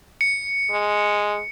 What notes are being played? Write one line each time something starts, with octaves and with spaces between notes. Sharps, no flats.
C#7
G#3